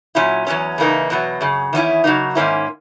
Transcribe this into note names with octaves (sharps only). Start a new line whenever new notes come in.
A#2 F#3 C#4 E4
E2 B2 F#3 C#4
C#3 E3 A#3 D#4
E2 B2 F#3
F#2 C#3
E2 D#3 F#3 C#4 E4
C#3 F#3 A#3 D#4
G#2 D#3 A#3 C#4 E4